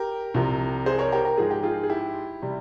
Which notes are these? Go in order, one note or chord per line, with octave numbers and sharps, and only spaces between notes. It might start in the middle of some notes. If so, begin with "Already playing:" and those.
Already playing: G4 A#4
C2 C3 F3
G#4 C5
A#4 C#5
G4 A#4
A#4
G#2 F3 G#3 G#4
G4
F4 G#4
G#4
E4 G4
C3 G3